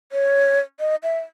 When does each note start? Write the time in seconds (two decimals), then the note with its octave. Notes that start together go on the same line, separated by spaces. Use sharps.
0.12 C#5
0.80 D#5
1.03 E5